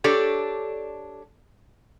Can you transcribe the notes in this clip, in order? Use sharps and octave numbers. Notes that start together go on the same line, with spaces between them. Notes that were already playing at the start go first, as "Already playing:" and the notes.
D4 G4 A4 C#5 D5